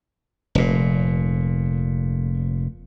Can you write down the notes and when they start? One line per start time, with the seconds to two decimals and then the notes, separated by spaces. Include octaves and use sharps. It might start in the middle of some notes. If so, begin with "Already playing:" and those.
0.55 F1 A#2